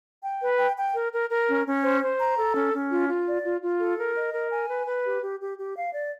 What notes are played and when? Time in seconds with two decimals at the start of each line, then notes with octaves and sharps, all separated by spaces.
0.24 G5
0.42 B4
0.59 G5
0.77 G5
0.95 A#4
1.13 A#4
1.30 A#4
1.49 C#4
1.66 C#4
1.83 C5
2.01 C5
2.19 A#5
2.37 A4
2.54 C#4
2.73 C#4
2.91 F4
3.08 F4
3.26 D5
3.45 F4
3.63 F4
3.79 A4
3.98 A#4
4.16 D#5
4.33 A#4
4.51 G#5
4.69 B4
4.86 B4
5.05 G4
5.22 G4
5.41 G4
5.59 G4
5.76 F5
5.94 D5